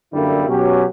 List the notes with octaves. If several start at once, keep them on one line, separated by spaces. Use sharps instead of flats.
F#2 D3 G3 A#3 E4
B2 F#3 C#4 G4